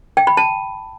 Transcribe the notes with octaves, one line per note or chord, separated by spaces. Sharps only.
G5
B5
A5